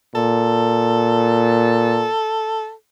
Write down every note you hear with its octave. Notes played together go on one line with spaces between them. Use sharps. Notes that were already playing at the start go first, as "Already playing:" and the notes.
A#2 A4